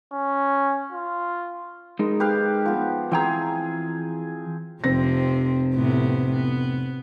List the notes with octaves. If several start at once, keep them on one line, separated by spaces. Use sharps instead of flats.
C#4
F4
G#3 D#4 A#4
G4 B4 F5
F3 B3
E3 C4 G#4 G5 A#5
F1 C3 F3 C4 A#6
A2 C3 B3
B3